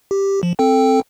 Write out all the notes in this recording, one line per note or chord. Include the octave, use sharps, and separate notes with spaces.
G4
F3
C4 A4 G5